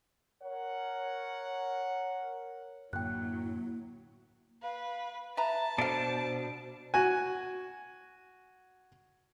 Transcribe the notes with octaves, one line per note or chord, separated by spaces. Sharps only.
A#4 C#5 F#5
F#2 A2 D3 F#3 A#3 E4 G5 F#6
B4 F5
B4 E5 A5 A#5
B2 D4 A4 C5 F5
F#4 G#5